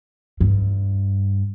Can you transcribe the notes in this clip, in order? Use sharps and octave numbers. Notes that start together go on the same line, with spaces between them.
G2